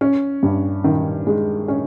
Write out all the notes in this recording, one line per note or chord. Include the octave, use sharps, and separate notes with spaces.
C#4
G2
D#3
G#3
C#4